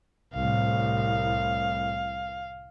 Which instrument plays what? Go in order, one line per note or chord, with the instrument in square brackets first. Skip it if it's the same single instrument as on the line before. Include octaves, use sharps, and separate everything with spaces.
[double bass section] C2 A2 [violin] F5